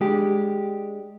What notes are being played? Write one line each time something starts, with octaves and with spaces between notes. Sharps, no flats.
G#3 D4 G4